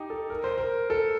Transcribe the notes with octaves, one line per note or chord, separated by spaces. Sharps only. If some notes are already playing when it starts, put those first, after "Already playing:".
Already playing: D#4 G4
A4
A#4
C5
A#4
A4